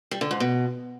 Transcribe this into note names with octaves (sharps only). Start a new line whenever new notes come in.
G3
D3
G#2
B2